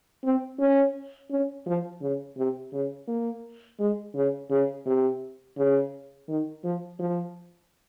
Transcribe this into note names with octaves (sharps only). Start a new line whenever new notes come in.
C4
C#4
C#4
F3
C#3
C3
C#3
A#3
G#3
C#3
C#3
C3
C#3
D#3
F3
F3